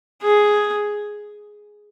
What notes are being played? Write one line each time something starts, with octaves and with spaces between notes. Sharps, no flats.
G#4